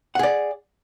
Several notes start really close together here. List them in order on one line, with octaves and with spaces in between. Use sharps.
F#5 G#4 D5